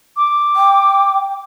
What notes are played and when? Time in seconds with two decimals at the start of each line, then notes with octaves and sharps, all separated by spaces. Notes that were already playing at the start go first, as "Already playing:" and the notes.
0.17 D6
0.56 G5